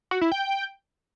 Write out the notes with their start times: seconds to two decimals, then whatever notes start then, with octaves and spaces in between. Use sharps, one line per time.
0.11 F#4
0.21 E4
0.32 G5